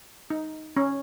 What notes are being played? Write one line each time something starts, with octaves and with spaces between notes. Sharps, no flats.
D#4
C#4